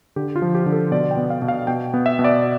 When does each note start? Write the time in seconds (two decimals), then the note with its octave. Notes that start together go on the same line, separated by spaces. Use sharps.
0.16 D3 G4
0.36 F4
0.42 F3
0.55 G4
0.66 D3
0.72 A4
0.91 B2 D5
1.11 G5
1.17 B3
1.30 F5
1.42 B2
1.48 F5
1.67 B2 G5
1.94 B3
2.06 E5
2.19 B2
2.24 D5